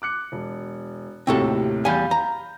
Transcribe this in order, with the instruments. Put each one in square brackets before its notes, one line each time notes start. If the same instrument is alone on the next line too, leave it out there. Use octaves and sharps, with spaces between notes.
[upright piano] D6 F#6 C#7
E1
[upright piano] D#2 A2 C3 [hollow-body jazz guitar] C4 F#4 A4
[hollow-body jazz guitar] E2 G3 G#5 [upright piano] F5 B5 G6
[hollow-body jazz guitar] A#5